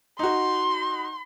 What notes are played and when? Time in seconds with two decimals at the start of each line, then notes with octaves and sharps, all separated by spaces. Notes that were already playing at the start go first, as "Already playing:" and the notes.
0.19 D#4 F#4 C6